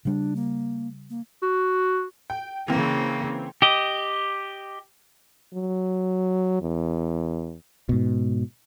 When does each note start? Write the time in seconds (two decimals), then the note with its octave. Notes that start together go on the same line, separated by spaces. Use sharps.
0.05 C#3 G3 D4
0.36 A#3
1.10 A#3
1.42 F#4
2.30 G5
2.68 C#3 E3 A#3 C4
3.62 G4 D#5
5.54 F#3
6.61 E2
7.89 G#2 B2